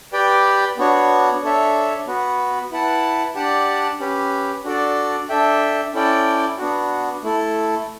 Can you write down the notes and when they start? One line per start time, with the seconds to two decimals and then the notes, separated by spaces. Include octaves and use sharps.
0.13 G4 B4 D5 G5
0.78 B3 D4 F#4 C#5
1.42 D4 A4 C#5 E5
2.07 B3 F#4 B4
2.71 E4 B4 F#5 A5
3.35 D4 G4 D5 F#5 A5
4.00 C#4 G4 B4
4.64 D4 F#4 A4 D5
5.29 D4 A4 E5 G5
5.94 C#4 E4 A4 D5 G5
6.58 B3 D4 F#4
7.23 A3 E4 A4